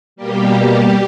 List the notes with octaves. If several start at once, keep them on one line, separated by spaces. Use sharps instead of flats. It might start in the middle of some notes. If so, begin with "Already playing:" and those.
B2 G3 A#3 G4